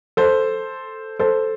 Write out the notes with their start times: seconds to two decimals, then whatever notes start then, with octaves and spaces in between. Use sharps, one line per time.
0.17 A4 C5
1.19 A4 C5